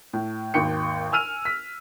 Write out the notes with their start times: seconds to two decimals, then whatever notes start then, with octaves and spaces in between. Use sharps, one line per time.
0.13 A2
0.54 G#1 D#2 G5 C#7
1.12 G#5 E6 F6 D#7 F7
1.45 B6